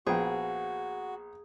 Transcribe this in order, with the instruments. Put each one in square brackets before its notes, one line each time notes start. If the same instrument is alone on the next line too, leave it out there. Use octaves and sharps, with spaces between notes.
[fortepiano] A#1 B3 G5 [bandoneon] F#4 [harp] G#4